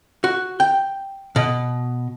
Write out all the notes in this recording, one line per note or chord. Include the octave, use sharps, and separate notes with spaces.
F#4
G5
B2